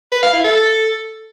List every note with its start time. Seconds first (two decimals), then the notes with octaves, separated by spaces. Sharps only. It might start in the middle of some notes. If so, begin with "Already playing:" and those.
0.12 B4
0.23 F5
0.33 E4
0.44 A4